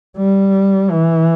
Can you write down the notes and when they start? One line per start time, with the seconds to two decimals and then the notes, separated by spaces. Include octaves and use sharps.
0.17 G3
0.90 E3